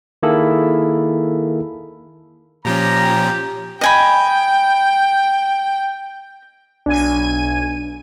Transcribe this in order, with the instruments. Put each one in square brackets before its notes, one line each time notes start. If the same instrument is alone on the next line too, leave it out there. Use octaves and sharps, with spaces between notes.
[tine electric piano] D#3 A#3 E4 G#4 A4 B5
[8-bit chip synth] A#2 F3 C#4 [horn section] G4 A#5
[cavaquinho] D#5 G#5 B5 [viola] G5
[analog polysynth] B1 G#5 D#7 [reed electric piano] D4